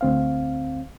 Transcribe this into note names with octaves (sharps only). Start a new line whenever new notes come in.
D2 C4 F5